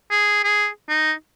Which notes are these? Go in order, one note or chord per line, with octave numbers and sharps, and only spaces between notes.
G#4
G#4
D#4